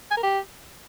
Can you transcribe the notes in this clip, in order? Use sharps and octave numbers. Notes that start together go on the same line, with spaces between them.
G#5
A#4
G4